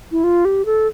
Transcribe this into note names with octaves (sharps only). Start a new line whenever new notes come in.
E4
F4
G4
A4